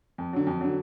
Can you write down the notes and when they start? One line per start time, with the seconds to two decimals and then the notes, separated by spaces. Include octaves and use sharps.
0.18 F2
0.33 D3 F#3
0.47 F2
0.61 D3 F#3